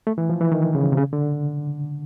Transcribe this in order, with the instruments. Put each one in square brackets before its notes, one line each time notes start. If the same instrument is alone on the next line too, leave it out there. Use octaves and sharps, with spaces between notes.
[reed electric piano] A3
E3
F3
E3
D#3
C#3
C3
C#3
D3